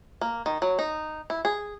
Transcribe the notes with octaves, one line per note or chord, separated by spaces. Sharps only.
A#3
D#3
F#3
D#4
E4
G#4